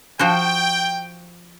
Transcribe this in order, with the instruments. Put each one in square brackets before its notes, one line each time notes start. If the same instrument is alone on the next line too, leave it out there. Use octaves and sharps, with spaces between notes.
[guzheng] F3 F#4 C5 [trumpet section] G5